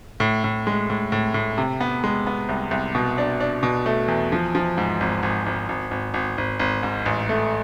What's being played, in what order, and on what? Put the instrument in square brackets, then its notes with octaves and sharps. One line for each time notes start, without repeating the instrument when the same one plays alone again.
[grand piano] A2
A2
G#3
A2
A2
A2
C3
B3
G#3
B3
C2
C2
B2
D4
D4
B2
A3
E2
F3
F3
G#2
G#1
G#1
G#1
G#1
G#1
G#1
G#1
G#1
G#2
A1
A3